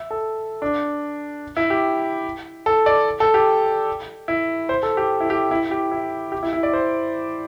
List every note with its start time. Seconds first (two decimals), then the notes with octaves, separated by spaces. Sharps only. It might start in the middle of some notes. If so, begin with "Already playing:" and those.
Already playing: E5
0.11 A4
0.62 D4
1.56 E4
1.70 G4
2.66 A4
2.86 D5
3.20 A4
3.34 G4
4.28 E4
4.69 C5
4.83 A4
4.97 G4
5.20 E4
5.30 G4
5.51 E4
5.71 G4
5.91 E4
6.32 G4
6.43 E4
6.53 E4
6.63 D5
6.73 C5